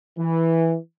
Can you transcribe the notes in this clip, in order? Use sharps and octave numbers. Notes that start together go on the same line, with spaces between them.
E3